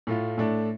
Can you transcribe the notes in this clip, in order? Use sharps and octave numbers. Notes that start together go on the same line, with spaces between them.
A2 A3 F4
A2 A3 D4